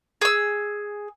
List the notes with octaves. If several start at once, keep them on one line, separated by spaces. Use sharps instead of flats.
G#4 E6